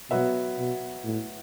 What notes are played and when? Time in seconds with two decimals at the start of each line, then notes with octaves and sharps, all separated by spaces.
0.10 B2 F#3 B3 F#4 B4 E5
0.58 B2
1.04 A2